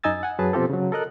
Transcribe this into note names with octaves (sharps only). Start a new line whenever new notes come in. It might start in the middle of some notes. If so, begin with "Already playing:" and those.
F#2 D#4 D#5 G#5 E6 A6
F#5 G#5
F#2 F#3 G#4 B4 A5
B2 F3 C4 F4 G4 A4
C#3 F#3
A4 A#4 D#5 F#6